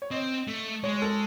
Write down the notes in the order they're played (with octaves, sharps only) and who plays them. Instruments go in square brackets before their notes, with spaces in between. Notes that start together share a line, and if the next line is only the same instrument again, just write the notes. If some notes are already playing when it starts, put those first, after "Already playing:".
[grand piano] C#5
[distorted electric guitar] C4 [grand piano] D#5
[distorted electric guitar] A3
[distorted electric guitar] G#3 [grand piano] C#5
[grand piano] A4